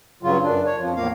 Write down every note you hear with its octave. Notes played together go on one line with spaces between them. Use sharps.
G2 C#3 F#3 F4
F#2 D4
C#5
F2 F3
E2 A2 A#3 F5